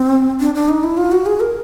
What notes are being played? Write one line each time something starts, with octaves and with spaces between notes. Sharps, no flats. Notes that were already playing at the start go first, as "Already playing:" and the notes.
Already playing: C4
D4
D4
D#4
E4
F4
F#4
G#4
A#4